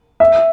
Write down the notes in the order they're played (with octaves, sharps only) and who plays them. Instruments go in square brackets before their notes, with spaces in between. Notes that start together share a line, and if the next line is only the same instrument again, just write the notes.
[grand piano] E5